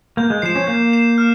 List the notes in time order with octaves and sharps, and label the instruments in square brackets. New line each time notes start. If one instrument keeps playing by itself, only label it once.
[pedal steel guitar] A#3 [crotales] G6
[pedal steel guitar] G#3
[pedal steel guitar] F3 [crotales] C7 E7
[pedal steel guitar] C#4
[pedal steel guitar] A#3 [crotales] G6
[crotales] C7 E7
F6